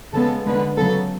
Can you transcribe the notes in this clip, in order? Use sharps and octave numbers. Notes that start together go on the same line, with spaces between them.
C#3 G#3 B3 A4
D3 G#3 B3 B4
C#3 F#3 B3 A4